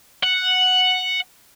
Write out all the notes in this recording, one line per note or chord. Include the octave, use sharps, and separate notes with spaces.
F#5